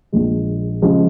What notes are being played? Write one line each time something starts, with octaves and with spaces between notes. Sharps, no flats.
A#1 A#2 F3 G#3
C#3 F3 G#3